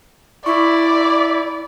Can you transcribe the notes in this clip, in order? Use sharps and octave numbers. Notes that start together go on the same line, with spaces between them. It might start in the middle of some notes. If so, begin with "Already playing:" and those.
E4 D5 C#6